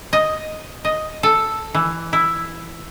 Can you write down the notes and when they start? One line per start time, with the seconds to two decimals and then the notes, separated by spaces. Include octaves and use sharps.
0.13 D#5
0.85 D#5
1.23 A4
1.74 E3
2.13 E4